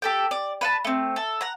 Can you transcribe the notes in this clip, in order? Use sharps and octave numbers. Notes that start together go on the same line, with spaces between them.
G4 A4 G5
D5
B4 F#5 A5
A3 C4
A4
F#5 A#5